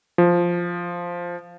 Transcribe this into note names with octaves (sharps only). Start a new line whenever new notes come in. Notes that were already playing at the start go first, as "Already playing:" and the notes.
F3